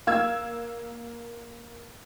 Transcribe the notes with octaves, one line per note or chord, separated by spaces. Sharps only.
A#3 F5 E6 G#6